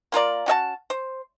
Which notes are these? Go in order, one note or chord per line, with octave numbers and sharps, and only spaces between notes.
A#3 F4 A#4 D5
C#4 F#4 E5 A5
C5